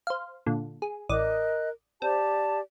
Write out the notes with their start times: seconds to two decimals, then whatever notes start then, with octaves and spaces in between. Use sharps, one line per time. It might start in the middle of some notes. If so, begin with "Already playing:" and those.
0.07 C5 F5
0.46 A#2 D3
0.82 G#4
1.09 A1 A#4 D5 D#5 D#6 F#6
2.02 C4 G4 D5 A5